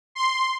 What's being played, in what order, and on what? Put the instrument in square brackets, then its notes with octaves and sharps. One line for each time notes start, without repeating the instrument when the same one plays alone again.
[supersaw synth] C6